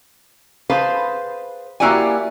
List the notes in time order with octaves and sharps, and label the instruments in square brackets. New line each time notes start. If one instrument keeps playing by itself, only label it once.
[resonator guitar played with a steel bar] G#4 B4 C5 F5 A5
A#3 E4 F#4 G4 D5 G#5